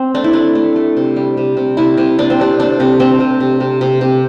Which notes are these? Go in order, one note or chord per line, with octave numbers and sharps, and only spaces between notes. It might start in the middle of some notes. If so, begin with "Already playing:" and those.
Already playing: C4
A3 D4
E4
A3 D4
A3
A3
C3
G3
C3
C3
C3 E4
C3
C3 D4
C4
C3 D4
A3 D4
C3
A3 C4
C3
C3
C3
C3
C3